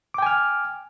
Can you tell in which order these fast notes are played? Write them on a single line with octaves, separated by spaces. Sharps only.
D6 G5 G#5 F6